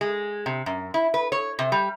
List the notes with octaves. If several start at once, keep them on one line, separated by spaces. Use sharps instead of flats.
G#3
C3
F#2
E4
B4
C#5
C3
G3